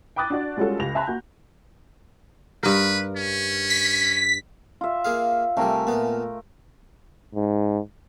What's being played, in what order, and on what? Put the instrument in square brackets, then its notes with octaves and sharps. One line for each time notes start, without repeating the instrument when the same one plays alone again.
[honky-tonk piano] G5 B5 D6 D#6 F#6 A6
D4 F#4 D5
G3 G#3 C#4 F4 F#4 A4
C#2 G4 A#6 F7
E5 G#5 A5 B5 C6 F#6
A#3 F#4 G6
[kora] G2 A#4 [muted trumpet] B4
[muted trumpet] C#4
[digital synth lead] B6
[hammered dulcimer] F4 E5
[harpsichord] A#3 G#4 F5
[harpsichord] C3 G3 [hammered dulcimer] A3 A#4 G#5
[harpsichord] A#2 B3
[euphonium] G#2